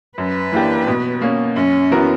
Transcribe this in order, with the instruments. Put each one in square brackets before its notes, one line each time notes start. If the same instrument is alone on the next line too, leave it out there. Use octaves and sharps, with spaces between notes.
[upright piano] F#2 [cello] B4
[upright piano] E3 A#3 D4 G4
B2
A#3 C#4
[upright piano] F#2 [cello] C#4
[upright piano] E3 B3 F#4 A#4